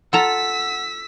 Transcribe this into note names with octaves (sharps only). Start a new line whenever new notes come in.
F4 A4 F#5 A#5 E6 B6